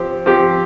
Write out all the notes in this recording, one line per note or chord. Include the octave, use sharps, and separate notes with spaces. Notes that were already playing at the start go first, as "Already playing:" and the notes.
Already playing: F3 C4 G4
F3 C4 G4